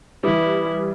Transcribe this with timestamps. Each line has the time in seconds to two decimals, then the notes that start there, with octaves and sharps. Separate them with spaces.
0.24 E3 G3 E4 B4 D6 D#6